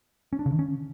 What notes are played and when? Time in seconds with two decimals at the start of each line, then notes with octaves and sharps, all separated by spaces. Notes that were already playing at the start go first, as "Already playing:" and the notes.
0.33 C#4
0.39 D4
0.46 C#3
0.52 D#3
0.59 C#4